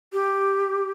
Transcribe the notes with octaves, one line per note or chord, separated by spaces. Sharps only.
G4